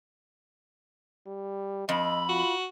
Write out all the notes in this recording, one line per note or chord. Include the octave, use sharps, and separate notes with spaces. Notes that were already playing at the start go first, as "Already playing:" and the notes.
G3
F2 D#5 B5
F4 F#4